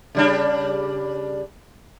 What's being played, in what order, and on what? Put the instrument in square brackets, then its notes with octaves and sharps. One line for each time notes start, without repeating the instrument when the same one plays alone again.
[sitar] C#3 G3 D4